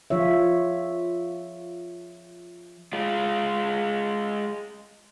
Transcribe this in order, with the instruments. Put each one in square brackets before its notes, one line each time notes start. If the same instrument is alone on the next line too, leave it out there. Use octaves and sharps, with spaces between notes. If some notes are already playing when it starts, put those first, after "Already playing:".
[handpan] F3 F4 C#5 E5
[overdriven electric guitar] G#3 F4